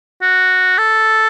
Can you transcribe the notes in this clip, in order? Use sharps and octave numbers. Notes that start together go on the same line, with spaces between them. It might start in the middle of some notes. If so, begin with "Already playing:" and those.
F#4
A4